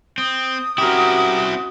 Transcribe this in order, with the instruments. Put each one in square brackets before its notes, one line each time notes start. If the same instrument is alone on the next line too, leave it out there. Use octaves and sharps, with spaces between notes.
[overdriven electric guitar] C4 [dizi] D#6
[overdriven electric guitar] C4 E4 [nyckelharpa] C#4 F#4 [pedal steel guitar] G4 A#4